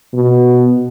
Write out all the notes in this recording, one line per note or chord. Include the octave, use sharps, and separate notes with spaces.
B2